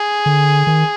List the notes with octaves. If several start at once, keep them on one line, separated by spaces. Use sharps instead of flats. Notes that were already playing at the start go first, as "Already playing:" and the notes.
Already playing: G#4
D3
D#3